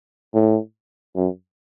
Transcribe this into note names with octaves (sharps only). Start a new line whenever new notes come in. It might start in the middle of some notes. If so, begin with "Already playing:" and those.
A2
F#2